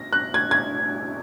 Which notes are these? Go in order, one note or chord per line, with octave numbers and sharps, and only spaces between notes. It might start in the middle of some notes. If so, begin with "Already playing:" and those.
Already playing: A#6
F#6
G#6
G#6